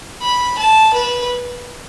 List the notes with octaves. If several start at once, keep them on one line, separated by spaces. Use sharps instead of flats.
B5
A5
B4